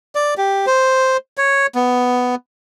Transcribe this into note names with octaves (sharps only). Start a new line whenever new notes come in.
D5
G4
C5
C#5
B3